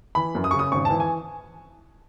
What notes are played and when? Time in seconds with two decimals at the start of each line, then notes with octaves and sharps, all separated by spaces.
0.15 E3 B5
0.35 F#2
0.44 D#6
0.51 C#3 C#6
0.59 D#6
0.72 G#1 C#6
0.85 E3 A5
1.00 G#5